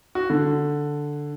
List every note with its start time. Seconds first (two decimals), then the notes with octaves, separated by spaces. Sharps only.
0.15 F#4
0.30 D3